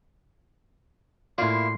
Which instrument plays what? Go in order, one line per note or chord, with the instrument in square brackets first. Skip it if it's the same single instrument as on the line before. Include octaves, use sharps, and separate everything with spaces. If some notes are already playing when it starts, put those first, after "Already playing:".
[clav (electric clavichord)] A2 D5 [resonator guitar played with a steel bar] A#3 E4 [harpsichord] F4 [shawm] C6